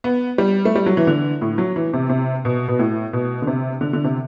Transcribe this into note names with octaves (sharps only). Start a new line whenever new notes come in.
B3
G3
A3
G3
F#3
E3
D3
A2
F#3
E3
C3
C3
B2
B2
A2
B2
D3
C3
D3
D3
C3